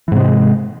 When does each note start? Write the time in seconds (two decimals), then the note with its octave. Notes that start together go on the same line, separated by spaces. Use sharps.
0.08 E3
0.12 G#2
0.16 C3
0.19 G#3